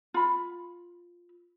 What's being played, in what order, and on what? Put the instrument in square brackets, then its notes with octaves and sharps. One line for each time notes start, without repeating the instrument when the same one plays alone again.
[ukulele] F4 B5